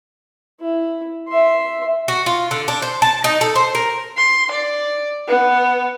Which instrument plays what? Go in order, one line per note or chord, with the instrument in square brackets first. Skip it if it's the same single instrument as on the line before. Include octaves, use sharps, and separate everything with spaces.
[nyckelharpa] E4
E5 C6
[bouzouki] F#4
F4
D3
D4
C5
A5
D#4
A4
C5
A#4
[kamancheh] C6
D5
B3